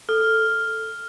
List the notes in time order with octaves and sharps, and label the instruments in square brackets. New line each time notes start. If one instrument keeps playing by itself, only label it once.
[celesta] A4 [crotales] F6